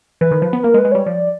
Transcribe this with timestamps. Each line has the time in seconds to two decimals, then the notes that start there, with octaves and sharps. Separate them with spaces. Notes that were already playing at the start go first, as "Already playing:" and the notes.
0.21 E3 B4
0.31 D#3
0.42 F3
0.53 B3
0.63 A#3 A#4
0.74 G#3
0.78 B4
0.85 G#3
0.92 G3 C#5
1.06 F3 D5